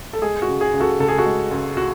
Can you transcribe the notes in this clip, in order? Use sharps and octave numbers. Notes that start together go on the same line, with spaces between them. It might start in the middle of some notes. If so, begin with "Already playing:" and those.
A4
G#3 G#4
F#4
C#2
G#4
C#2
F#4 A4
C#3 A4
G#4
F#4 A4
G#3
C#2
F#4